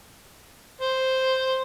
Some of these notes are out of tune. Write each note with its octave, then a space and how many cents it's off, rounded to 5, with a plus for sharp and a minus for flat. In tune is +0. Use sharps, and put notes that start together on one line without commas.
C5 +0